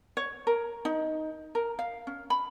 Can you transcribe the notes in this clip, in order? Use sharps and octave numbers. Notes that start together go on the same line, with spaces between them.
C#5
A#4
D#4
A#4
F5
C#4
B5